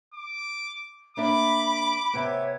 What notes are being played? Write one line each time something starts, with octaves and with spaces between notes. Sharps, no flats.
D6
A#3 D4 E5 B5 D6
C3 B3 C#5 E5 G#6